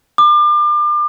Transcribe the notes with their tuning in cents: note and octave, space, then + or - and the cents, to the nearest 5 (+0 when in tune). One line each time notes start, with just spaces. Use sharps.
D6 +35